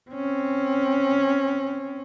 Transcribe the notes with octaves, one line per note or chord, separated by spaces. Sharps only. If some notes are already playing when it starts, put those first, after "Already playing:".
C4 C#4